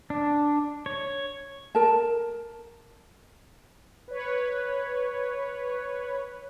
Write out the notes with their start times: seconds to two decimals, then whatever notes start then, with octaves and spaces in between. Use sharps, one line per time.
0.10 D4
0.86 C#5
1.75 A#4 A5
4.08 B4 C#5